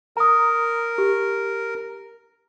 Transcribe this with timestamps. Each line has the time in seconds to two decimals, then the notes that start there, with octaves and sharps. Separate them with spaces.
0.17 A#4 A#5 D#6
0.98 G4